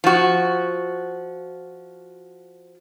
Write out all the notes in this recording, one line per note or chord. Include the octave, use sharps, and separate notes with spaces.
F3 F#4